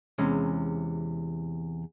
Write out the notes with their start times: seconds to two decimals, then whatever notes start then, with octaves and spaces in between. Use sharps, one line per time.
0.18 E2 C3 G#3 C#4